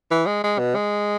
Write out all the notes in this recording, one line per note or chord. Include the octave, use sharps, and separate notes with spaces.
E3
G#3
G#3
B2
G#3